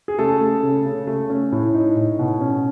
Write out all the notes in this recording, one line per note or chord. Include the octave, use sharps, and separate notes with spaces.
G#4
C#3 A3 A4
A3
C#3
C#3
A3
C#4
A2
D#4
A2
B2
C#4